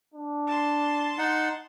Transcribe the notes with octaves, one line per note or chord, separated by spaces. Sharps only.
D4
A5 C6
D#4 F#5